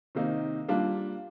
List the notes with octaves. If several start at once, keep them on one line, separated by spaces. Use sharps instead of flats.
C3 D#3 A#3 D#4
G3 A#3 D4 F4